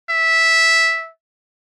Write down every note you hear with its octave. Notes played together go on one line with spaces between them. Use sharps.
E5